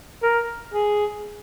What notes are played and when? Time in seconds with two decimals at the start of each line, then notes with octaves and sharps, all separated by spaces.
0.22 A#4
0.74 G#4